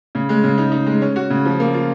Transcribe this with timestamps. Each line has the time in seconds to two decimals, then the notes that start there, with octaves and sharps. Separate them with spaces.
0.15 C#3
0.29 G#3
0.44 C#3
0.58 D#4
0.72 D#4
0.86 G#3
1.02 C#4
1.16 F#4
1.30 C#3
1.45 F3
1.60 A#3
1.74 F4